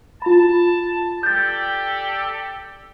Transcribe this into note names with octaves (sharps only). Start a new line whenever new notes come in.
F4 A5 B5
G4 A4 D5 G6 A6